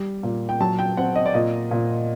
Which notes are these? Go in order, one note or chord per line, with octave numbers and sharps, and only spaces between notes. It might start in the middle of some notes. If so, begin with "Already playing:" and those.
Already playing: G3
A#2
G5
F#3 A5
G5
C4 F#5
D#5
D5
A#2 D#5
A#2